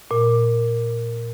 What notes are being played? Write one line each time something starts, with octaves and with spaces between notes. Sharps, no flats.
A#2